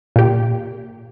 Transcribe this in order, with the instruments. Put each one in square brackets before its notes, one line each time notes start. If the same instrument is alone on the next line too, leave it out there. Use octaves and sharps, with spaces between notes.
[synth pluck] A#2 G4